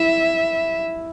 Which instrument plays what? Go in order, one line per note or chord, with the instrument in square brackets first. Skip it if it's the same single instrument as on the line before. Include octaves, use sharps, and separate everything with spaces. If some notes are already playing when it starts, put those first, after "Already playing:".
Already playing: [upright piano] E4 [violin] E5